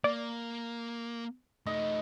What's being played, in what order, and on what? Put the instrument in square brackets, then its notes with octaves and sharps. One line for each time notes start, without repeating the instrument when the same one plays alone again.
[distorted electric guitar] A#3 [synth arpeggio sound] D5
[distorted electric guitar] A3 D#4 [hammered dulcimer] D#5